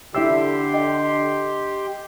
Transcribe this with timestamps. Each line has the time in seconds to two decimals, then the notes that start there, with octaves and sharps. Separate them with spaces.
0.15 D3 E4 G4 E5 C6 E6
0.74 D#5 G5